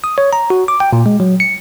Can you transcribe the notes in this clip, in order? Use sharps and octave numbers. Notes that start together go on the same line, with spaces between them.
D#6
C#5
A#5
F#4
D6
G5
A#2
G#3
F#3
C#7